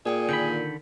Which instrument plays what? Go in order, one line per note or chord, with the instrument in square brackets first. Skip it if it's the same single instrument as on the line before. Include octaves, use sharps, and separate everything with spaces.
[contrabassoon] A#2 [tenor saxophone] G#4 [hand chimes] D5 G5 G#5
[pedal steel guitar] D3 D#3 B5 [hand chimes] A#4 G6